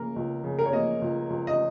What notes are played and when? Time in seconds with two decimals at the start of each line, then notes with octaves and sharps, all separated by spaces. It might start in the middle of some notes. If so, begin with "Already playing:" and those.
Already playing: C#3 A#3 A#4
0.16 C#2
0.44 C#3
0.59 A#4
0.66 C#5
0.73 A#3 D#5
1.02 C#2
1.30 C#2
1.47 D#5